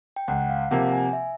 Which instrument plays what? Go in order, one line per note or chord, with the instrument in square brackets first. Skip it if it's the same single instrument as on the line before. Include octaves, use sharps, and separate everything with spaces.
[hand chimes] G5
[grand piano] C#2 [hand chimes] F#5
[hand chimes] F5
[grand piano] C3 F3 A#3 [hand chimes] F#5
[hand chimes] G#5
E5